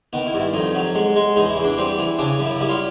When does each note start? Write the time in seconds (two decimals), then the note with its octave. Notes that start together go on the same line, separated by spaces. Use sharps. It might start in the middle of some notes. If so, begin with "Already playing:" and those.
0.13 D#3 B3
0.26 E4
0.34 G2
0.40 E4
0.54 F2 D#4
0.75 F#3
0.95 G#3
1.16 G#3
1.36 E2 D#4
1.50 E4
1.57 E2
1.64 D4
1.77 G3 C4
1.99 E3
2.19 C#3 D4
2.40 F#2
2.46 E4
2.60 G3 E4
2.69 F4